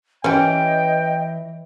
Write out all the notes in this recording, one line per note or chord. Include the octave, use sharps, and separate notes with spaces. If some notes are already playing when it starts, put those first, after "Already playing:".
E3 C#4 G4 D#5 G5